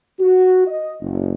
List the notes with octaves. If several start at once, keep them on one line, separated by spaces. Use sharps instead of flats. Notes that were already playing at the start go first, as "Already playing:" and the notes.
F#4
D#5
F#1